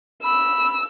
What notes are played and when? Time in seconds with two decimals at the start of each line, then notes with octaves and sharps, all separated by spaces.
0.23 B5 E6